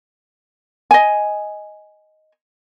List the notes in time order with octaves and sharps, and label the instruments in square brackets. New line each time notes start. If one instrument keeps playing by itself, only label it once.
[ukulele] D#5 G#5